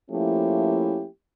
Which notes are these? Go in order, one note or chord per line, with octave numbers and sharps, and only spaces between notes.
F3 A3 A#3 C#4 E4 G4